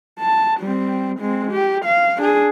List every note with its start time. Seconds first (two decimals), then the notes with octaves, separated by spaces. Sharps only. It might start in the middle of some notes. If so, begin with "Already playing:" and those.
0.19 A5
0.60 G3 C4
1.19 G#3 C4
1.51 G4
1.85 F5
2.17 D4 G#4